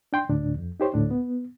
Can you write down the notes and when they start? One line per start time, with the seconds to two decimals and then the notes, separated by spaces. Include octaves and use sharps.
0.13 D4 G5 C6
0.29 D2 A2 D4
0.55 F2
0.80 D#4 G4 C5 C#5
0.94 D2 A2 D4
1.11 B3